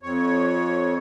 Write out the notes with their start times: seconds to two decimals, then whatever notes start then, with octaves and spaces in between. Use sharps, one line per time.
0.03 F2 C#5